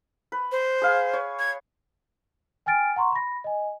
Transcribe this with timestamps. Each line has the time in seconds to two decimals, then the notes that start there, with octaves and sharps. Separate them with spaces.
0.32 B4
0.52 C5
0.82 G#4 F5 G#5
1.13 C#5
1.39 G#6
2.66 G5 G#5 F6 A6 D7
2.96 F#5 A#5 C6 C#6
3.12 B5 A#6
3.44 D#5 G#5